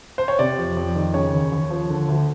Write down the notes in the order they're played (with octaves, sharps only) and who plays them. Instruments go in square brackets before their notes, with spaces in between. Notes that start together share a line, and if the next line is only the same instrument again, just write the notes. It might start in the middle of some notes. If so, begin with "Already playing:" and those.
[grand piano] C5
C#5
C3 D5
F2
F2
D#3
C#3 C#5
D#2
D#2
F3
D3
D2